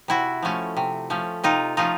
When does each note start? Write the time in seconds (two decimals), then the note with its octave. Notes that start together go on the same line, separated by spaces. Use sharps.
0.08 C3 E4 F#4
0.43 F3 A3 C#4
0.77 C3
1.10 F3 A3 C#4
1.44 C3 D#4 F4
1.77 F3 A3 C#4 D#4 F4